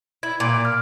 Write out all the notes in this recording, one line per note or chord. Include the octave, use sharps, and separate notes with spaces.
E4 G#6
A#2 D6
F6